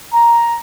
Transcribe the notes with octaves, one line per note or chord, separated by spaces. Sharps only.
A#5